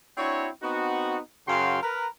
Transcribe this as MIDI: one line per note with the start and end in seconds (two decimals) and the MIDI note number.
0.17 0.49 60
0.17 0.49 62
0.17 0.49 64
0.17 0.49 66
0.17 0.49 73
0.62 1.18 59
0.62 1.18 60
0.62 1.18 63
0.62 1.18 66
1.47 1.81 42
1.47 1.81 49
1.47 1.81 66
1.47 1.81 77
1.47 1.81 79
1.47 1.81 84
1.82 2.06 70
1.82 2.06 71